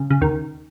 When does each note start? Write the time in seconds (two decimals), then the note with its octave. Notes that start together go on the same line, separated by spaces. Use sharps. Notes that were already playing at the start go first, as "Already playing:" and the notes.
Already playing: C#3
0.10 C#3
0.21 D#2 D#3